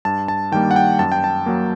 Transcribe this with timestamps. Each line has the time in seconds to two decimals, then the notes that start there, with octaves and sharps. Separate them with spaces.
0.05 G2 A5
0.28 A5
0.52 D#3 G3 A#3 G5
0.71 F#5
0.76 G5
0.99 F#2 A5
1.12 G5
1.24 A5
1.46 F#3 A#3